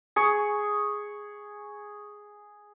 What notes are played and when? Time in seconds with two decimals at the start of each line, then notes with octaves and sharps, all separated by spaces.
0.16 G#4 C#6